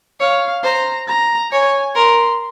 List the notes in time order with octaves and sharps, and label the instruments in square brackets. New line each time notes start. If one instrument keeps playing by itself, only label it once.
[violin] C#5 [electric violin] F5
[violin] C5 [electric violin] A#5
[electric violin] A#5
[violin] C#5 [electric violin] G#5
[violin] A#4 [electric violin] C6